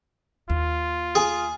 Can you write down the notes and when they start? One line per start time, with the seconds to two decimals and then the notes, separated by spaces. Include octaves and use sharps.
0.50 D#2 F4
1.15 G#4